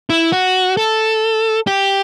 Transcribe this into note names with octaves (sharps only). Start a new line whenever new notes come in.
E4
F#4
A4
G4